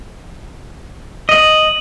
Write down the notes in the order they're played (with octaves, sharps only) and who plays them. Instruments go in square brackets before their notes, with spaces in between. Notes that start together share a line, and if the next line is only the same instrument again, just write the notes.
[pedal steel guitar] D#5 [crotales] D#7 F#7